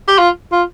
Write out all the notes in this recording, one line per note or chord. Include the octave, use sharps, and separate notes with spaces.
G4
F4
F4